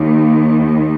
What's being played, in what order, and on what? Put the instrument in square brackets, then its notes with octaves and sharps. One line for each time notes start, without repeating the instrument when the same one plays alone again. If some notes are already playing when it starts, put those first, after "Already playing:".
Already playing: [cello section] D#2 D#3